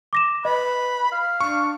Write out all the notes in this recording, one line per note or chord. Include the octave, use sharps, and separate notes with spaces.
D6 A#6 E7
B4 D#5 B5
F5
D4 C#6